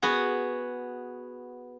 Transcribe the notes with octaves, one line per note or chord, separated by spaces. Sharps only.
B3 F#4 G#4